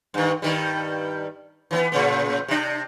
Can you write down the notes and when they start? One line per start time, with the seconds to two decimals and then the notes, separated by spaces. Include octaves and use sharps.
0.14 G2 D#3
0.42 G2 D#3 G3
1.71 E3 F3 B3
1.92 A2 C#3 B3
2.48 C3 D4